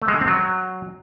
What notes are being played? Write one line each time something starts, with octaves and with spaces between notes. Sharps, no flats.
A3
G#3
D3
C4
F#3